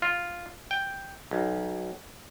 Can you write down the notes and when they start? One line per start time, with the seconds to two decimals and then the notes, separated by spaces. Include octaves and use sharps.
0.02 F4
0.71 G5
1.31 B1